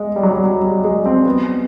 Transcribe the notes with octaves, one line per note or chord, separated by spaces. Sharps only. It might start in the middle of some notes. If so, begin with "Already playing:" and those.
Already playing: G#3
G3
F#3
G3
F#3
G3
G#3
C4
B3